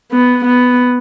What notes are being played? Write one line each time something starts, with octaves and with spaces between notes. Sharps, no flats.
B3
B3